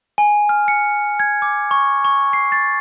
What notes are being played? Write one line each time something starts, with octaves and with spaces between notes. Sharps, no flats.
G#5
F6
C#7
G#6
D6
C#6
C#6
C7
A6